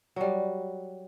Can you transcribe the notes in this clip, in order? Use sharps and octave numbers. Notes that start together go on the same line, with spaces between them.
F#3 G3